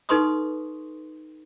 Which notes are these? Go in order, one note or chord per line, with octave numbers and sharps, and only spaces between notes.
D#4 A4 B4 C6 C#6 D#6